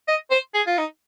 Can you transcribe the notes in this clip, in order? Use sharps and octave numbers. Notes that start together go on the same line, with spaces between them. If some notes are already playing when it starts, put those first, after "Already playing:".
D#5
C5
G#4
F4
D#4